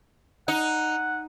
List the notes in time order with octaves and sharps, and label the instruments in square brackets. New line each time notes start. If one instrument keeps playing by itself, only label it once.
[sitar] D#4 [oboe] F#5